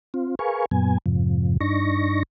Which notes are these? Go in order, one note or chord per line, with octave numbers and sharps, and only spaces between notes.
C4 F4
G#4 A#4 B4 F5 G#5 C#6
F#2 A#2 F#3 B3 G#5
F2 G#2 C3 F3
G2 D4 D#4 C#6 A#6